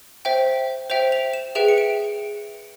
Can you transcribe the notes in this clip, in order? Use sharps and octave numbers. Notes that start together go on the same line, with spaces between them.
C5 E5 G5
C5 E5 G5 F7
F7
E7
G#4 B4 E5 G5 E7
C#7
D7